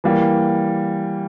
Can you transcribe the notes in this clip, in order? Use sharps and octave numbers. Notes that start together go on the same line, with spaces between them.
E3 G3 A#3